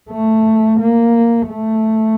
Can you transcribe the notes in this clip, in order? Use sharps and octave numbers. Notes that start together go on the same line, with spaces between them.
A3
A#3
A3